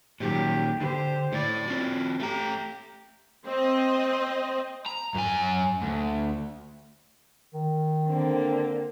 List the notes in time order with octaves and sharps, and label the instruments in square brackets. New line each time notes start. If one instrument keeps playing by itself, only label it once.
[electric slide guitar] A#2 D#3 [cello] F#3 G4
[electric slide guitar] D3 [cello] G4 C5
[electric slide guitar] A2 E4 [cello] D5
[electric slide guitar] C4 F4 F#4 [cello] C#4
[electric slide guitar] A3 A#5 [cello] G4
[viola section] C4 D#5
[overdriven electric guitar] A#5
F#2 G#5
D2
[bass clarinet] D#3
[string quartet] D3 A#3 C4